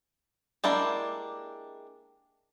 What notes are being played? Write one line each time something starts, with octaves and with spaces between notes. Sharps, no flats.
G#3 A#3 D4 E4 G4